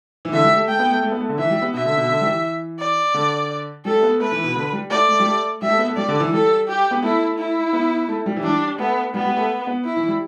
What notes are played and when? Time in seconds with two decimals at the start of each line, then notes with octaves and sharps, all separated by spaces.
0.25 E3
0.33 D3 E5
0.44 G3
0.55 A3
0.68 A3 G5
0.79 B3
0.90 A3
1.03 A3
1.12 B3
1.21 A3
1.29 D3
1.38 E3 E5
1.50 G3
1.62 B3
1.74 B2 E5
1.85 D3
1.97 B2
2.09 D3
2.20 G3
2.26 E3
2.79 D5
3.14 D3
3.85 G3 A4
3.96 A3
4.03 B3
4.20 A3 B4
4.32 E3
4.44 B2
4.56 D3
4.73 G3
4.90 A3 D5
5.08 A3
5.20 G3
5.26 A3
5.62 G3 E5
5.70 A3
5.78 B3
5.88 A3
5.96 G3 D5
6.08 D3
6.20 E3
6.32 G3 A4
6.68 G4
6.91 B3
7.03 A3 E4
7.38 E4
7.73 B3
8.08 A3
8.26 G3
8.36 E3
8.43 G3 D4
8.79 A3 B3
9.14 G3 B3
9.25 G3
9.37 A3
9.67 B3
9.85 E4
9.96 E3
10.08 G3